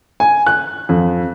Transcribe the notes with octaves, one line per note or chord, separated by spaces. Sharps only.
G#5
F#6
F2